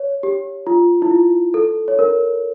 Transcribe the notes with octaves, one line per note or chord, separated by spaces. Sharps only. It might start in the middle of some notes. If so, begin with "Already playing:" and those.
Already playing: C#5
G4
F4
E4
F4
A4
C#5
A#4